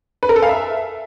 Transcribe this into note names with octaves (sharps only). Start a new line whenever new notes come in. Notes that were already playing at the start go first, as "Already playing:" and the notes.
B4
A#4
A4
F5
E5